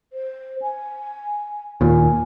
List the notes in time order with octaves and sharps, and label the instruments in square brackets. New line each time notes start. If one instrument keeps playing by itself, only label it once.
[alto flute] C5
G#5
[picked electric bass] D#2 A#2 [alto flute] G#5